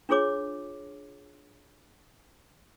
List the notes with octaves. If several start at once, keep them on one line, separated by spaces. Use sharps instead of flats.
D4 F4 G#4 C#5 D6